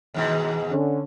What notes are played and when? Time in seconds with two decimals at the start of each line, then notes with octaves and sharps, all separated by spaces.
0.14 D#2 G#2 B2
0.71 D3 C#4